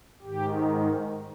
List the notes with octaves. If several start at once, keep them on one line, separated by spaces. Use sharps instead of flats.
G#2 D#3 G4